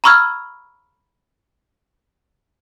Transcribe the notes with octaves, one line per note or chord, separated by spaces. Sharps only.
A#5 B5 C#6 E6 F6 G#6